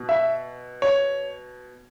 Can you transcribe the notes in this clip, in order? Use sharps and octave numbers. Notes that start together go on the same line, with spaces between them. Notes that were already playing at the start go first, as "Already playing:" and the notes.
Already playing: B2
E5
C#5